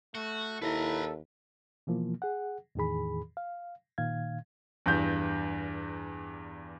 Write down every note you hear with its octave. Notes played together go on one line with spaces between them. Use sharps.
A3 F#4
D#2 E4 A4 B4 A#5
B2 E3 F3 A#3
G#4 F#5
E2 A2 D#3 E3 G#4 B5
F5
A#2 D#3 F5 G#6
E2 G2 G6